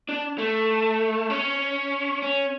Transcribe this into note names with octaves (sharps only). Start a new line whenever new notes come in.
D4
A3
C#4
C#4